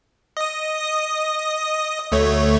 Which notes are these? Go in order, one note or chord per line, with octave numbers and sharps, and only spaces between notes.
D#5 D#6
D2 A3 C#5